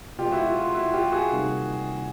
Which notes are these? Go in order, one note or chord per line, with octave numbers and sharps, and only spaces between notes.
B2 G#3 B3 F4 G4
E4 F#4
F4
F4
E4 F#4
F4 G4
F#4 G#4
C3 D#3 G3 A#3